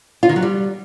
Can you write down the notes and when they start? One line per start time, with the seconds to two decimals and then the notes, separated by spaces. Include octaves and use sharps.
0.23 F4
0.29 D#3
0.36 F#3
0.42 G3